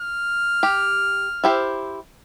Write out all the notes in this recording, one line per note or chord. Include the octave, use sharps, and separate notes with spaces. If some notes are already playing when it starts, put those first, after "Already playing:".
F6
G4
E4 G4 C5